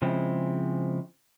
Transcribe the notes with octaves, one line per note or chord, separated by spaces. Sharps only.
C#3 F3 G#3 C4 E4